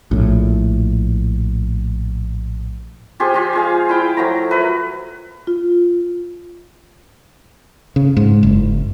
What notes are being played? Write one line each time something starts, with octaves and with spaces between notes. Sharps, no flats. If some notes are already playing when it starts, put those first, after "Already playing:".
A#1 A2
F4 G4 G#4 C5
F3 F4 G#5
G#3 G#4 F5
E4 F5 G5
F3 F#3 A3 A#5
A#4 B4 E5
F4
C#3
G#2
F#1